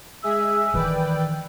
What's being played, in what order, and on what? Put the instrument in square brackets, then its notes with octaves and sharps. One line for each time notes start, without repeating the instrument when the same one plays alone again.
[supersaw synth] G#3 G#4 E5 [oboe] E6
[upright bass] D#3 E3 [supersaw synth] B4 D5 G5